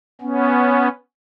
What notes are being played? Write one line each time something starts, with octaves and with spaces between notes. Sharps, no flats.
B3 C#4